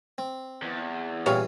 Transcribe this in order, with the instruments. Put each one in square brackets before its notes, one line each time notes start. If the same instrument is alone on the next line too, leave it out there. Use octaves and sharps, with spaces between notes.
[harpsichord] C4
[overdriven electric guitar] E2
[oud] A#2 F4 G4 [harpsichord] C#3 E3 G3 [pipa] C#5 F5